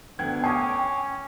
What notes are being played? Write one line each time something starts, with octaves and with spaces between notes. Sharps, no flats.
D2 B3 G5 G#6
C#4 G#5 D6 D#6 C7